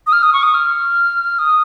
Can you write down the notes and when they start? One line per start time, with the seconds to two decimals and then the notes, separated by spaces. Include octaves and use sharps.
0.07 D#6
0.13 F6
0.23 D#6
0.33 C#6
0.43 D#6
0.54 F6
1.39 D#6